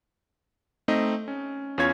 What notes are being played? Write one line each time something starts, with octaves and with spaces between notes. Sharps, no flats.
A3 C4 D#4 D#5
C#4
E2 C#4 F4 C#5 G#6